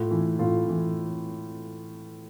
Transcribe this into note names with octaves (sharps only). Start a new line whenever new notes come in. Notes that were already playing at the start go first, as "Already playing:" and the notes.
Already playing: A2 F4
E3
A2 F4
E3